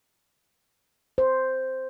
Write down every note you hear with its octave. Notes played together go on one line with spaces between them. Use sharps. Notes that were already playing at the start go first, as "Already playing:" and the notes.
C5